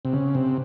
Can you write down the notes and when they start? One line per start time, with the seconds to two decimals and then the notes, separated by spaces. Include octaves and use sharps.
0.05 C3
0.13 C#3
0.35 C3